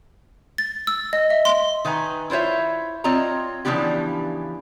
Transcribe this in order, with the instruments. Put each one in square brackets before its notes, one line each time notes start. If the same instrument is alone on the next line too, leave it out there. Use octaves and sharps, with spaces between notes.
[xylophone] A6
E6
D#5
E5
C6
[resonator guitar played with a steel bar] D#3 B4 G#5 A#5
E4 F4 C5 C#5 E5
C4 F4 C#5 D#5 A#5
C#3 E3 F3 B3 D4 G4